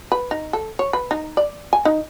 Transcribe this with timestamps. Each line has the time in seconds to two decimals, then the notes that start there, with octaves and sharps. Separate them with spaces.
0.12 B4
0.31 D#4
0.53 A4
0.79 C#5
0.93 B4
1.11 D#4
1.37 D5
1.73 G#5
1.85 D#4